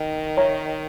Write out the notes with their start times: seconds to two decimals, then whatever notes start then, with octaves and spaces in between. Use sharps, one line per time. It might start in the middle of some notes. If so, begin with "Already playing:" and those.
Already playing: D#3
0.37 A#4 C#5 E5 A#5